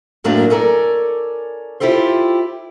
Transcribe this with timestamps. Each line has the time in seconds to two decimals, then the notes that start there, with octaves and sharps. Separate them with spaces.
0.24 F#2 A2 F#3 A3 A#3 D4
0.50 C#4 A4 A#4 D5
1.80 E4 F4 G4 A4 C5